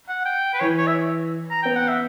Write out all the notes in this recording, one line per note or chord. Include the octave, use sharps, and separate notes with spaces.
F#5
G5
B4
E3 C#5
C#5
E5
A#5
B3 G5
F#5
E5